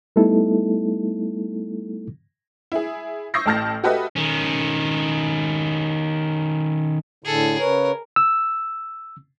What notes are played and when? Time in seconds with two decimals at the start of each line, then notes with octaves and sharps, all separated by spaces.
0.16 G3 A3 B3 D#4 E4 A4
2.72 E4 G#4
3.34 C#6 D#6 E6 G6 A#6 C7
3.46 A1 A2 A5 F6 G6 A#6
3.84 F#4 G4 A4 B4 D#5 E5
4.16 D#3 C#4
7.24 A2 D3 G#4 A4
7.59 C#3 A#4 B4 C#5
8.16 E6